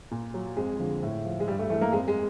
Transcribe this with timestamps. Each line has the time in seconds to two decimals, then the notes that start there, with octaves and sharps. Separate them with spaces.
0.11 A#2
0.34 F#3
0.57 F2 G#3
0.80 D3 F3
1.03 A2
1.25 F3
1.40 G#3
1.48 G2 G3
1.59 A3
1.70 E3 A3
1.81 A#3
1.92 F2 G#3
2.08 G#3